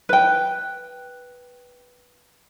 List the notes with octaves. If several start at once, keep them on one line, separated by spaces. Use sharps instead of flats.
B4 G5